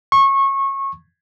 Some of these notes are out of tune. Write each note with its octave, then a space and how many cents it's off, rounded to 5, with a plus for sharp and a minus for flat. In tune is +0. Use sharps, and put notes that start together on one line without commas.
C#6 -25